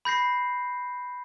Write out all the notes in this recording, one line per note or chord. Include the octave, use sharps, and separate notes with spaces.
B5 G6 A#6 C7